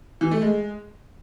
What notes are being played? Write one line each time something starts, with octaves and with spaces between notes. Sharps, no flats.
E3
A3
G#3